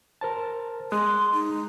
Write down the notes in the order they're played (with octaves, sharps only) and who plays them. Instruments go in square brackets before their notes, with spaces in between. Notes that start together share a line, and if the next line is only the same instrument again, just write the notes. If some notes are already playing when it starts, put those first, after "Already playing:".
[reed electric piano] A#4 C5 A5
[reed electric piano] G#3 D#6 F#6 [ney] C6
[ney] D#4